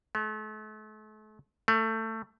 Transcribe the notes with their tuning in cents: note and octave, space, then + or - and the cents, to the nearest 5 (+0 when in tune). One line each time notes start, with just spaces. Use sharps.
A3 -40
A3 +20